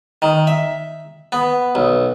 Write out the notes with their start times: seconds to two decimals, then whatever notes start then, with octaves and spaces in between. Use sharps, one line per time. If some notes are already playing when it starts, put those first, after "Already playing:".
0.22 D#3
0.47 E5
1.32 B3
1.75 B1